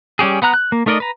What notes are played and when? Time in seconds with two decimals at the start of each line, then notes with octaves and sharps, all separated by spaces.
0.19 G3 C#4 G4 G#4
0.42 B3 F#5 A#5 F#6
0.54 F#6
0.72 A#3
0.86 A3 D#4 A#4 D5 D#5
1.00 B4 A#5